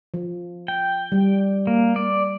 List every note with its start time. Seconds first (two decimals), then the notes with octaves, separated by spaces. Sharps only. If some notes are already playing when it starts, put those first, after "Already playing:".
0.14 F3
0.68 G5
1.12 G3
1.67 A#3
1.96 D5